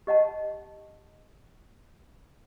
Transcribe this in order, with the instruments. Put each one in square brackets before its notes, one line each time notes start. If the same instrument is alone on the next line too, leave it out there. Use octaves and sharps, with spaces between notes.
[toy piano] G4 D#5 F#5 A5